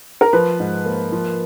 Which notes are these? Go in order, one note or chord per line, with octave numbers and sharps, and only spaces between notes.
A#4
F3 B4
G#2
A#3
F3